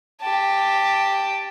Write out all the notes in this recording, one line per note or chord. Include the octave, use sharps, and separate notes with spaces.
G4 A5